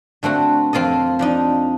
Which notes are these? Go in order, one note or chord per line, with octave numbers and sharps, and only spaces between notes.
D3 A3 C4 F#4
F2 C4 F4 A4 D#5
F3 D4 D#4